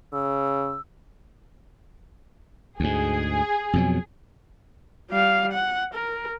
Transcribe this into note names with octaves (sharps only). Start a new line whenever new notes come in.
C#3 E6
D2 G#2 G#4
F2 B2 F#3
G3 F5
F#5
A#4